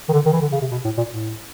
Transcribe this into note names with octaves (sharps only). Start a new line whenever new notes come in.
D#3
D3
D#3
E3
D3
C#3
C3
B2
A2
A#2
A2